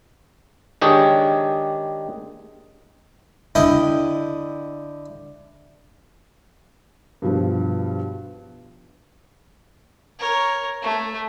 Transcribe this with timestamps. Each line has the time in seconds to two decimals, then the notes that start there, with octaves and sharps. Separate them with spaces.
0.81 D#3 G#3 D4 G4 G#4 C#5
3.55 D3 E4 D#5 G5
7.22 G2 B2 F3
10.19 A#4 C#5
10.82 A3